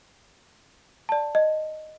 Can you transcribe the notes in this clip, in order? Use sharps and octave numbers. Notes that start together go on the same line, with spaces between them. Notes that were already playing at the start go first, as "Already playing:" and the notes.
D5 A5
D#5